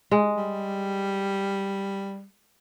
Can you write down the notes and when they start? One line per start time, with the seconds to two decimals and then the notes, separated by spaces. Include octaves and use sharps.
0.11 G#3
0.36 G3